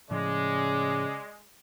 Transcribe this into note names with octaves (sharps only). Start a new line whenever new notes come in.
A2 C#3 F3 G#3 D5